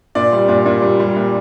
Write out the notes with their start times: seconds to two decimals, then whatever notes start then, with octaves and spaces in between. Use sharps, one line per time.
0.15 A#2 D5
0.32 G3
0.49 A#2
0.66 A#2
0.82 G3
1.00 G3
1.16 A#2